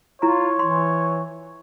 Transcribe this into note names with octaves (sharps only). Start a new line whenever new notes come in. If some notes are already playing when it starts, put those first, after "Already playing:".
E4 F4 C#5 A#5
E3 C6